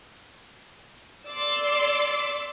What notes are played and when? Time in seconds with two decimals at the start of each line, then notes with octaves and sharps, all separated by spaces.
1.29 D5 C6 D6 E6